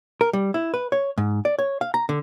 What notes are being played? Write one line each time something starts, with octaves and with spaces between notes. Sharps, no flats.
A#4
G3
E4
B4
C#5
G#2
D5
C#5
F5
A#5
D3